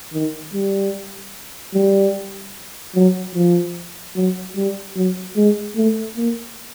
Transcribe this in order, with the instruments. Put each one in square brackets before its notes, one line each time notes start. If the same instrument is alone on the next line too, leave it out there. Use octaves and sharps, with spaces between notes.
[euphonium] D#3
G3
G3
F#3
F3
F#3
G3
F#3
G#3
A3
A#3